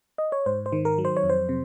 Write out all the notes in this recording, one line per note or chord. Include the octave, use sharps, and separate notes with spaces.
D#5
C#5
G#2 C5
C5
D#3
A#4
F#3
C5
C#5
F2
C5
C3